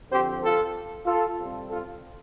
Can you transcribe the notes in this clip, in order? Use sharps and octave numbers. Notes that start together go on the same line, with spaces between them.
D3 F3 C4 G4 C5
F4 A4
F4 A4
C3 G3 C4
F4 A4